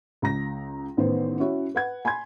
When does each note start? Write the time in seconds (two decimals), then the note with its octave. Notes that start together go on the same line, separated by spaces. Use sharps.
0.22 C#2 A#5 A#6
0.97 A1 D#3 B3 C5
1.40 C#4 E4 F#4 C#5
1.75 B4 F#5 G#6
2.05 G#5 B5 C6 G#6